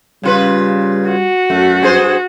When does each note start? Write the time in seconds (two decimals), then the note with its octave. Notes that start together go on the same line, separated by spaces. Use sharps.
0.23 C#3 G3 F4 B4
1.09 F#4
1.50 F#2 A3
1.83 G2 G#4 C5